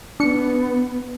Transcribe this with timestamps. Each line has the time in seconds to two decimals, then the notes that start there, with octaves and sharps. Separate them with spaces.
0.20 B3 D4 C#7